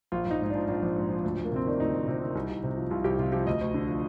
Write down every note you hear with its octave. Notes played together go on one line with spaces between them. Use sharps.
A#1 F4
A#1 D#4
G#2 D#4
F3 D4
A#1 D4
A#1
G#2
F3
D2
D2
A#3
C3 C4
D#3 D4
D2 D#4
D2
C3
D#3
C2
C2
C3
F3
C2 F4
C2 G4
C3 F4
F3 G4
D2 D#5
D2
D3
F3